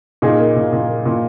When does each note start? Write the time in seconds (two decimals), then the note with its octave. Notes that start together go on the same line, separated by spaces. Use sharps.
0.22 A#2 D#4 G#4
0.40 A#3
0.56 A#2
0.72 A#2
0.88 A#3
1.06 A#2